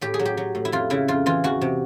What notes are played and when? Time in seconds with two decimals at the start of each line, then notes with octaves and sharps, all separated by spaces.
0.01 A2 G4
0.14 G#4
0.19 F#3
0.25 G4
0.37 F#3
0.55 A2
0.65 E4
0.72 F2 F4
0.90 C#3 E4
1.08 F2 F4
1.26 E3 F4
1.44 E2 F#4
1.61 C3